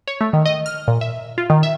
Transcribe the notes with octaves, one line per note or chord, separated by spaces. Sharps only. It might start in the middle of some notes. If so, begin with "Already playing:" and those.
C#5
A3
D#3
D#5
F6
A#2
E5
F4
D#3
E5